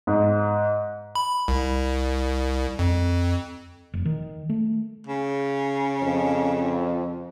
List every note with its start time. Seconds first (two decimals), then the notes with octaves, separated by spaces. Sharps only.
0.07 G#2
1.15 B5
1.48 C2
2.79 F2
3.94 F1
4.05 D#3
4.49 A3
5.07 C#3
6.03 F2